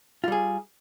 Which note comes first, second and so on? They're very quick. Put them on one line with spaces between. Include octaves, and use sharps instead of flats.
F4 G3 G#4